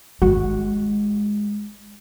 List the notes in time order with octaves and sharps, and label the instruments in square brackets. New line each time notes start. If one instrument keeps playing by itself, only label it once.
[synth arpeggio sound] G#1 F#4 [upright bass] G#3